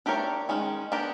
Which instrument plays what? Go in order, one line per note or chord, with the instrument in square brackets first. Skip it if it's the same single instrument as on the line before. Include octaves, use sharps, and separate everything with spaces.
[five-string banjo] A3 D4 G4 A#4 C#5
D#3 G#3 C#4
B3 D4 G4 A#4